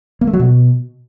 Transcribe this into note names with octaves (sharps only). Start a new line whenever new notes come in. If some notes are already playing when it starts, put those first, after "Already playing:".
A#3
A3
F#3
B2